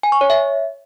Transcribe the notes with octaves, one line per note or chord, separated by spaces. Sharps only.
G#5
C#6
C#5
E5